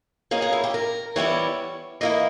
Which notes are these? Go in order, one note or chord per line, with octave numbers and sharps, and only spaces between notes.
B2 A#3 C#4 G#4
G#4
E4
G4
A#4
E3 G3 B3 E4 C#5
E3 A#3 E4 D#5